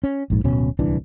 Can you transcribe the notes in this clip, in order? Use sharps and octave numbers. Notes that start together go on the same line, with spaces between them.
C#4
A#1 G#2
D1 B2 C#4
D1 C2 E3 D4